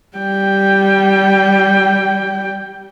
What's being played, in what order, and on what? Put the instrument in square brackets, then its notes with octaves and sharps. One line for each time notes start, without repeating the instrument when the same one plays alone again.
[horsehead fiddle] G3 G5